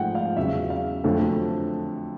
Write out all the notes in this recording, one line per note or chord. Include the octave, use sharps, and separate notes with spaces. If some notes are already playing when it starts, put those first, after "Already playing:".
Already playing: G#2 F3 A3 F#5 G5
F5
E2 C#3 F#3 E5
F5
F2 D3 F#3 A3